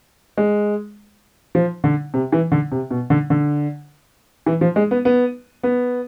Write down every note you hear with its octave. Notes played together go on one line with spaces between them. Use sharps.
G#3
F3
D3
C3
E3
D3
C3
B2
D3
D3
E3
F3
G#3
B3
B3
B3